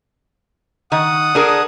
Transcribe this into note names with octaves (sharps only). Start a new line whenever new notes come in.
D#3 F#5 D#6
D4 G#4 A#4